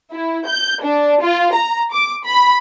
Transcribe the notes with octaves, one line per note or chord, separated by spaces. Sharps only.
E4
G6
D4
F4
A#5
D6
B5